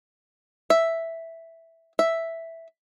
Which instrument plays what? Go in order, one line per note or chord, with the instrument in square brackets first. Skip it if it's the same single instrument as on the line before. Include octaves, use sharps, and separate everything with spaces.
[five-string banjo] E5
E5